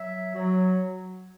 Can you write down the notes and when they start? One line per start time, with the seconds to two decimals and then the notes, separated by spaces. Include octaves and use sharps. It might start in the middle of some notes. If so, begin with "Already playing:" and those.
Already playing: F#3 E5
0.35 F#3